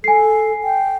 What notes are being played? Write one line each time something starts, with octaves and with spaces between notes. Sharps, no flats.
A4 G#5 C7
G5